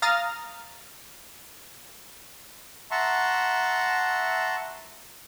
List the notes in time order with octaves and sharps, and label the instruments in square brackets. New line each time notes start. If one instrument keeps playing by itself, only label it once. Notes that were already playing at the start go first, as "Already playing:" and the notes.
[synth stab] F5 A#5 D#6 F6 A6
[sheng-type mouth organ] E5 F#5 A5 A#5 C6 C#6